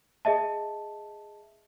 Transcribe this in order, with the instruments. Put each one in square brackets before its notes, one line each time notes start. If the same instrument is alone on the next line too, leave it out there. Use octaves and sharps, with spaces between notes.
[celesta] G#4 D#5 E5 A5